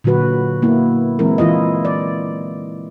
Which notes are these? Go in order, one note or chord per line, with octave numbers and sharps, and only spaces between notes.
A#2 D3 F#3 F#4 B4
A#3 B3 E4
E3 G#3 C4 E4 A#4
E3 E4 F4 D#5
D5